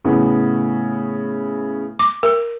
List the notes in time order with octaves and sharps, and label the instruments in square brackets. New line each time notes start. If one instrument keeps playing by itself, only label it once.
[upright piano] A2 C#3 B3
[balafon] D6
A#4